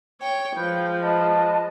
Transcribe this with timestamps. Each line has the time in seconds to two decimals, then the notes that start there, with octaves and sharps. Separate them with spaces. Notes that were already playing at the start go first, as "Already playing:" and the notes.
0.21 C#5 G5
0.55 F3 G#3 B4 G6
1.02 B4 D#5 A5